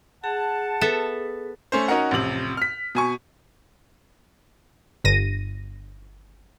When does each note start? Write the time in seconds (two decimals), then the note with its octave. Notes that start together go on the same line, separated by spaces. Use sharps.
0.24 G#4 F#5 A5
0.81 B3 A4 E5
1.72 A3 C#4 C5
1.88 C#4 D#4 F#4 A#4 F#5
2.11 A1 F2 C3 F#7
2.57 F6 B6
2.95 B2 G#5 C#6
5.04 G1 A#6 D#7